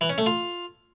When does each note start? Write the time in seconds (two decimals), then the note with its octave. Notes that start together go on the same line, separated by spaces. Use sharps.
0.01 E3
0.10 C#4
0.18 A3
0.26 F4